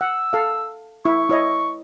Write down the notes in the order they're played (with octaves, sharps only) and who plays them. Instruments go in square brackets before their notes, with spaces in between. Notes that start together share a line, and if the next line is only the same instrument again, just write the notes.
[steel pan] F#5 [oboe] E6
[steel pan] A4 F5
[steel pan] E4 [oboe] C#6
[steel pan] E4 C#5 D#5